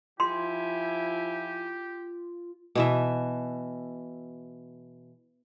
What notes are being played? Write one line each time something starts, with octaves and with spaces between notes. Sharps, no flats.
F3 E4 F4 G4 G#5 C6
B2 E3 E5